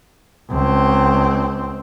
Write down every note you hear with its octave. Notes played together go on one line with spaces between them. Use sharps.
C#2 C4